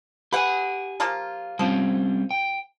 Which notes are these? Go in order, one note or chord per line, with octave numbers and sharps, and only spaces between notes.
G4 B4 F#5 G#5
F3 A#3 F4
F3 G3 C4 C#4
G5